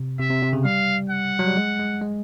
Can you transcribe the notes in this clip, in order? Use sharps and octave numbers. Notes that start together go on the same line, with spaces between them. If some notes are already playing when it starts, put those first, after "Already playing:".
Already playing: C3
C3 E5
C3
C3
C#3
G3 F5
F#5
F#3
G3
G#3
G#3
G#3